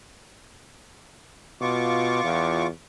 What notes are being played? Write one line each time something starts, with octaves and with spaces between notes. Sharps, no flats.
B2 F4 C#6 D6
E2